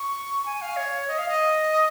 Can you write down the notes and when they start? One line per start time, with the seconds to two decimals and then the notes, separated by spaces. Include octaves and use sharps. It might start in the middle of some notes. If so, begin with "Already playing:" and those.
Already playing: C#6
0.46 G#5
0.62 F5
0.77 C#5
1.08 D#5
1.18 F5
1.29 D#5